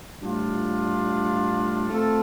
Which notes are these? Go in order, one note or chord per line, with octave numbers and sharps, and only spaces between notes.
A2 G3 D4 F4
A3 C4 F4 A4